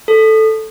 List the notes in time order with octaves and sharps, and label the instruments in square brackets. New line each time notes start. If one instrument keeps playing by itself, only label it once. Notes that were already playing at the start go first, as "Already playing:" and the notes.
[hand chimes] A4